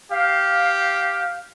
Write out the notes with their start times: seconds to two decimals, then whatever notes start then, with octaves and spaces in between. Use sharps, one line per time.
0.12 G4 F5